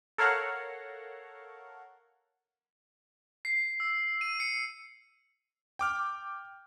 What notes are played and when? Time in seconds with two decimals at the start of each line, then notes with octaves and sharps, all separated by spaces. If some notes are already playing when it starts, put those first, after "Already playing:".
0.18 A4 A#4 C#5 F5 F#5
3.45 C7
3.80 E6
4.21 D#7
4.40 C#7
5.79 G5 D6 F6